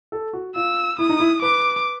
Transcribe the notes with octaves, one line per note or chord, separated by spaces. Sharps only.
A4
F#4
F4 E6
E4 D#6
D#4
E4
B4 D6